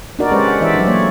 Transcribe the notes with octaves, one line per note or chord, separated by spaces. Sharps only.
D4 D#4 F#4 A#4 D5
G#3 C#4 G4 B4 C5 D5
F#5
E3 C5 D5 E5
F#3 D4
A3 A#3 C#5